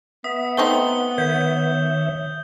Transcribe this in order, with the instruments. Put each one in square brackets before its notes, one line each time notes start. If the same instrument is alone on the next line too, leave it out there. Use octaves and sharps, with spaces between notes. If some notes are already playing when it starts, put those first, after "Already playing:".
[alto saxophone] B3 [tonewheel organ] E5 [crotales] D#6
[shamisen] A3 C4 D#4 [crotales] G7
[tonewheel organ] D#3 C#5 E5 [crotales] G6